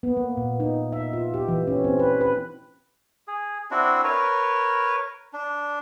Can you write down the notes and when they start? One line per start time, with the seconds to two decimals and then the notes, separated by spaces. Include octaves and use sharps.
0.03 B3
0.17 A#3
0.37 A#2
0.60 D#4
0.92 E5
1.13 F4
1.34 G4
1.48 E3
1.67 C#4
1.84 C4
1.99 B4
2.21 B4
3.28 G#4
3.71 C4 D4 E4 F#4
4.04 A#4 B4 C#5
5.33 D4